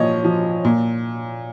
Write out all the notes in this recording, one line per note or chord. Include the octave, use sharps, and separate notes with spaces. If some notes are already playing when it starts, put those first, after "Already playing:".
Already playing: A#2 F3 C#5 D#5
F3
A#2